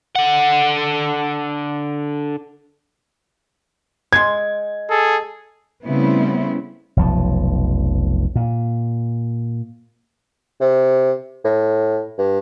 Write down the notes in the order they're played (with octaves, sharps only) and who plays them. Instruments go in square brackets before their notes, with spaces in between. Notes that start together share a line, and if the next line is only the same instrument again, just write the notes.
[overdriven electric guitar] D3 F#5
[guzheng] G#3 C6 [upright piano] G#6
[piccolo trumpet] G#4 [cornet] A4
[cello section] C#3 G3 A3 B3 C4 E4
[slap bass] F1 B1 F3
A#2
[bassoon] C3
A2
G2